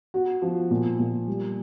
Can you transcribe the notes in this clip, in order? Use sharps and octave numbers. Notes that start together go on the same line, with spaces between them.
F#4
F3
A#2
A#2
G3